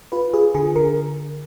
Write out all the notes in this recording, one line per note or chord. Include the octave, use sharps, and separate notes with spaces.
F4 B4
F4 G#4
D3 G#4
D3 A#4